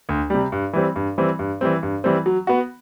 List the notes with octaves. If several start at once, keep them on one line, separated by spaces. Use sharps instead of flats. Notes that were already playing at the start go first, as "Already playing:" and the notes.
D2
C3 G3
G2
E3 G3 C4
G2
E3 G3 C4
G2
E3 G3 C4
G2
E3 G3 C4
F#3
B3 F#4